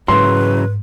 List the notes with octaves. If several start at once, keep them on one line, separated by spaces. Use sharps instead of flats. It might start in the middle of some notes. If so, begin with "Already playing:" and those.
G#2 C#3 E3 F#3 B4 C6